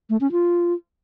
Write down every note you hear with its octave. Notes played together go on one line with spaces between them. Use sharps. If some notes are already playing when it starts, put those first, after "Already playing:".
A3
C#4
F4